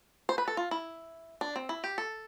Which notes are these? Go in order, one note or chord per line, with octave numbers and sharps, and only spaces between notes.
C5
B4
A4
F4
E4
D4
C4
E4
G4
A4